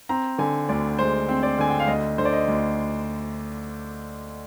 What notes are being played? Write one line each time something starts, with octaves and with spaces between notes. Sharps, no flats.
C4 A#5
D3 G#5
D2 D5
G#3 C5
C4
D5
D3 G#5
G5
F5
D2 D#5
D3 C5
D5
D#5
D2